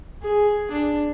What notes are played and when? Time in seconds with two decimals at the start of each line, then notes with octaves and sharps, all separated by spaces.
0.22 G#4
0.71 D4